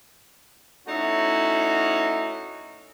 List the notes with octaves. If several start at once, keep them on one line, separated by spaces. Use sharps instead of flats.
A3 C#4 D#4 E4 F#4